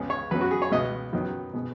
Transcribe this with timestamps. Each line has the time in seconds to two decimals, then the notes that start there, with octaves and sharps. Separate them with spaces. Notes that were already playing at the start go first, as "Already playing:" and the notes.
Already playing: C#2 C#3 G#3 B3 D#5
0.10 C#5
0.31 F#2 F#3 B3 B4
0.41 F#4
0.51 G#4
0.62 C#5
0.71 C#2 B2 B3 D#5
1.13 F#2 D#3 F#3 B3
1.54 B2 G#3 B3